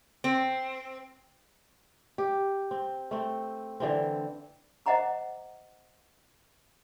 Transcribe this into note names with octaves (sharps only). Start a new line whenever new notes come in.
C4
G4
C4
A3 C4
D3 E3 C4
C5 D#5 E5 F#5 A#5 D6